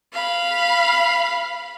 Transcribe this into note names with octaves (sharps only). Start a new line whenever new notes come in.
F5 B5